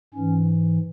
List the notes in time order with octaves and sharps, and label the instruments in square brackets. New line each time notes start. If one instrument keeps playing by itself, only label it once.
[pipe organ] G#2 E3 C#4